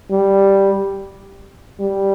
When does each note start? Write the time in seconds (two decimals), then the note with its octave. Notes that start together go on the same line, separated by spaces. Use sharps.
0.11 G3
1.80 G3